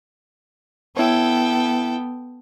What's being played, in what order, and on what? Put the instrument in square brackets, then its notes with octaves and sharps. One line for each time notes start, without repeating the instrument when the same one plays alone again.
[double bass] B3 [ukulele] E4 C#5 [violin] A4 G5